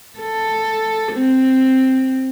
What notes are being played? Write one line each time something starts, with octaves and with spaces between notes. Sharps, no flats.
A4
C4